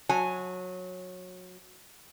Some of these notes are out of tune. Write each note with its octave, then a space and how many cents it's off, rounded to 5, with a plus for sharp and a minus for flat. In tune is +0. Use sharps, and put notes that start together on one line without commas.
F#3 -20 G#5 +5